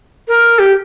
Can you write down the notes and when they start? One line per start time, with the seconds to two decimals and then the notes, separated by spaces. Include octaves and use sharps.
0.28 A#4
0.58 G4